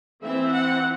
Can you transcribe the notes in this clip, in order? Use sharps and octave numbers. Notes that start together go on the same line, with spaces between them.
E3 C4 E5
F#5